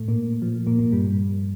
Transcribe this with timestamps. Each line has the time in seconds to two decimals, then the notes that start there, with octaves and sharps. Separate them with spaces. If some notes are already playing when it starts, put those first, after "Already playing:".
Already playing: A2 A3
0.08 A#2 A#3
0.42 F3
0.67 A#2 A#3
0.79 A#2 A#3
0.92 G2 G3